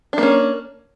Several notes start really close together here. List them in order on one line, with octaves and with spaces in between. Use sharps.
D4 A#3 C#4